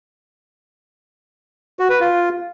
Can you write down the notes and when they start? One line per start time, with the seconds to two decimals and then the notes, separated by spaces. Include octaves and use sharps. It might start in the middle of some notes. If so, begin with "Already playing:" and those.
1.79 F#4
1.90 B4
2.00 F4